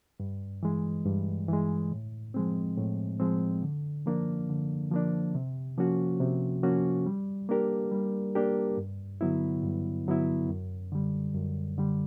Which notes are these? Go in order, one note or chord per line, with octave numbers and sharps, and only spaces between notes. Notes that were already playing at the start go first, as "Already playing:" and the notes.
G2
E3 G#3
G2
E3 G#3
A2
F3 G#3 C4
A2
F3 G#3 C4
D3
F3 A#3 D4
D3
F3 A#3 D4
C3
F3 A#3 C#4 F#4
C3
F3 A#3 C#4 F#4
G3
A#3 D4 G4 A#4
G3
A#3 D4 G4 A#4
G2
D3 F#3 B3 E4
G2
D3 F#3 B3 E4
F#2
D3 G3
F#2
D3 G3